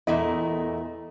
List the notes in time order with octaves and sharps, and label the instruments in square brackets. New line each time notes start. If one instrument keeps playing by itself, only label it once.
[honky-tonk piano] E2 D#5 [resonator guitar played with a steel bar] A#2 A3 E4